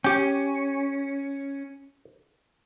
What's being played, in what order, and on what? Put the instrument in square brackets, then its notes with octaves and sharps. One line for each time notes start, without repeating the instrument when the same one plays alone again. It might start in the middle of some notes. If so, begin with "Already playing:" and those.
[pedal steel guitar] C#4 [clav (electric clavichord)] G4 G5